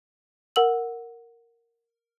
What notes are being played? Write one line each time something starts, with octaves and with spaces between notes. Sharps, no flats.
A#4 F#5 E6 F#7